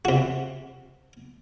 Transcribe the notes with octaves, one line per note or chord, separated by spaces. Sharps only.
C3 F#4